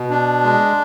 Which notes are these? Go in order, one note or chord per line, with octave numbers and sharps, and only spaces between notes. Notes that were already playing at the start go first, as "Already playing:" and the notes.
Already playing: B2
D4
G#3